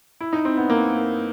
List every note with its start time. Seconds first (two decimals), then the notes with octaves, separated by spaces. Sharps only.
0.21 E4
0.33 D#4
0.45 C4
0.57 B3
0.70 A#3